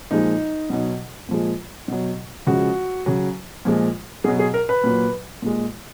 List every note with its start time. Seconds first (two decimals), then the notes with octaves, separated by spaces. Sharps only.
0.11 A#2 F3 G#3 D#4
0.70 B2 F#3
1.29 A#2 F3 G#3
1.88 B2 F#3
2.47 C#3 F3 G#3 F#4
3.06 C#3 F#3
3.65 A#2 F3 G#3
4.24 B2 F#3 G#4
4.39 G#4
4.54 A#4
4.69 B4
4.84 A#2 F#3
5.42 A#2 G#3